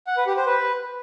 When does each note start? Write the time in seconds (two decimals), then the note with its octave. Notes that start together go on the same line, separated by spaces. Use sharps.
0.07 F#5
0.17 B4
0.27 G4
0.36 C5
0.46 B4